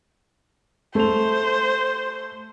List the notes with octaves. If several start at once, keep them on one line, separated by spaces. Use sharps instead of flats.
A3 C5 F7